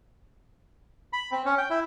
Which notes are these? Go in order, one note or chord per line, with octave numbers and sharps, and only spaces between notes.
B5
C4
C#4
G5
E4